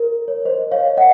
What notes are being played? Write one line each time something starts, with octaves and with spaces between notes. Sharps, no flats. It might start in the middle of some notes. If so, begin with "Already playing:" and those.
Already playing: A#4
C#5
C5 D#5
C#5 F5
D#5 F#5